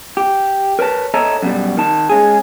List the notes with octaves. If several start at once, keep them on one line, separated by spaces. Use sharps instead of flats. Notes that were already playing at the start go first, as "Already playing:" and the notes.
G4
A#4 B4 C#5 A5
A4 C#5 D#5 E5 A5 A#5
F#2 B2 G3
D#3 A5
G#3 C#4 G#4